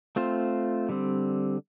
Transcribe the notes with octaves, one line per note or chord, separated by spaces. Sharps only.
A3 C4 F4 C5
D3 G3 C4